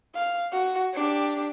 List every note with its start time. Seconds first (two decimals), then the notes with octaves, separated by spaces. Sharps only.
0.15 F5
0.52 F#4
0.94 D4 G4